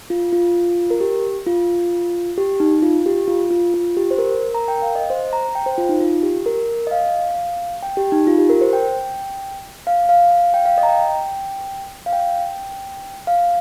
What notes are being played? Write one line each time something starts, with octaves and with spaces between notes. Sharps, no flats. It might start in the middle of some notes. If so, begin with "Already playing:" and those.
F4
F4
A#4
G4
F4
G4
D#4
F4
G4
F4
F4
F4
G4
C5
A#4
A#5
G5
F5
D#5
C5
A#5
G5
C5
F4
D#4
F4
G4
A#4
D#5
F5
G5
G4
D#4
F4
G4
A#4
C5
G5
F5
F5
F5
G5
F5
D#5
A#5
G5
F5
G5
F5